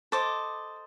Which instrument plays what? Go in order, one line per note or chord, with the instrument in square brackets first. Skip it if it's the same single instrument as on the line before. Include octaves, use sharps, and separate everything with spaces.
[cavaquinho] A4 C5 D#5 D6